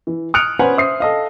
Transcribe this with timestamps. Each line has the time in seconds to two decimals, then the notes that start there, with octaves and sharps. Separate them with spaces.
0.07 E3
0.34 D#6 F6 F#6 C#7 D7 F7
0.59 B3 C#4 B4 C5 F#5 G#5
0.77 C5 E5 D#6 C7
1.00 A4 D#5 F5